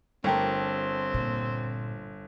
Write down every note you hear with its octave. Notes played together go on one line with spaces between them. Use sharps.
G1 A3 C4 G4 A#4
A#2